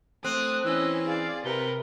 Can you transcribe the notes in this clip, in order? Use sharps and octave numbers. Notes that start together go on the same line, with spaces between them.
A3 C4 D#6 F#6
E3 C#4 D#5 E6
G#4 D5 F5
C3 A#4 B4 G7